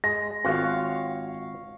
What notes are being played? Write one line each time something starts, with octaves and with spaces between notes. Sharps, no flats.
G#3 A#6
G#1 F4 F#4 C#5 F5